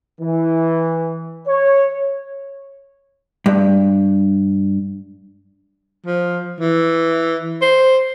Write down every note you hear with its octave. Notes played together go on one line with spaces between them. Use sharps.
E3
C#5
G2
F3
E3
C5